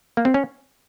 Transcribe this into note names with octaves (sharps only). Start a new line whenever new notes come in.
A#3
C4
C#4